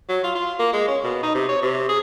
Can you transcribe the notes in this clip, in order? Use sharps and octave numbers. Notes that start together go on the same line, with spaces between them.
F#3
F4
F4
A#3
G#3
C#4
B2
D#4
C3
C#5
C3
G#4